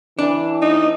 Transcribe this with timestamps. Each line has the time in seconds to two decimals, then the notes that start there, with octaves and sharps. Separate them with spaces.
0.19 E3 D4
0.62 D#4